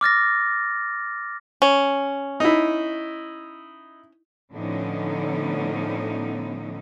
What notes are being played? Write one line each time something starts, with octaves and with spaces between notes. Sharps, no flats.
D6 F6 A6 A#6
C#4
D#4 E4
A2 D3 F3 B3 C#4 D#4